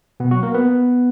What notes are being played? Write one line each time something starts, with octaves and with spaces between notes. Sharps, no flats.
B2 B3
F#3 F#4
A#3 A#4
B3 B4